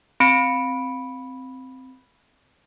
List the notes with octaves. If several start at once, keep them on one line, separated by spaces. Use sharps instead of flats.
C4 B5 C#7 D7